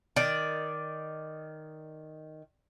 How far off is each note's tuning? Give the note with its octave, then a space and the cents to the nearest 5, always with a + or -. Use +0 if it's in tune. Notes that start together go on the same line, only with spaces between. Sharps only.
D#3 +0 D5 +0